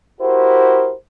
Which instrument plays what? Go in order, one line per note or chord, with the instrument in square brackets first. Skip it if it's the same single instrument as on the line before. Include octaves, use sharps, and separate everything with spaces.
[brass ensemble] E4 F#4 G4 A#4 C5